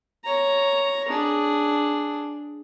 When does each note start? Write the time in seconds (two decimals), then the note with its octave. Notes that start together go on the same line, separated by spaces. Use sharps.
0.24 C#5 A#5
1.08 D4 G#4